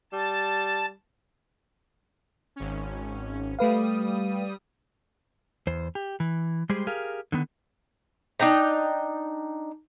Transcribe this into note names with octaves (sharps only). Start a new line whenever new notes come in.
G3 A5
G#1 C#4
G3 A3 B4 F5 D#6
E2 C5
G4
E3
G3 G#3 G4 G#4 C5
G4 G#4 A#4 F5
D3 D#3 B3
D4 D#4 G5 A#5